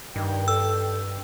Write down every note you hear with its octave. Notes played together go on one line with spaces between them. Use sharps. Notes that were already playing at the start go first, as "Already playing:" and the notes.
G2 D#3 G5
A4 E6